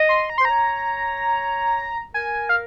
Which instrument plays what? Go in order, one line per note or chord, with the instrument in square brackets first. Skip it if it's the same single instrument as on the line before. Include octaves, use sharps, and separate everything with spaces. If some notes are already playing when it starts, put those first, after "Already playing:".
Already playing: [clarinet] D#5
[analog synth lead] C6
A#5
C6
[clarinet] C5
[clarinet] C#5 [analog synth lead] A#5
[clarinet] A#4 [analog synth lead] G#5
[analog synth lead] F5